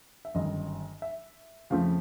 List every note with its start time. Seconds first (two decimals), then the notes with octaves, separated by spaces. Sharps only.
0.25 E5
0.34 G1 F#2 D#3 G3 D#5
1.02 E5
1.70 F2 C#3 F3 A3 C4 F5